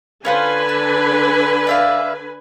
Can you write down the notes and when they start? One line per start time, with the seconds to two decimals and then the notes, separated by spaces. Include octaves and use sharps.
0.25 D3 C#4 F4 B4 C5 G#5
0.69 A5
1.67 D5 E5 F5